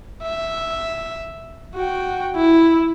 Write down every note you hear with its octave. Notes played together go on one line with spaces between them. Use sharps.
E5
F#4 G5
E4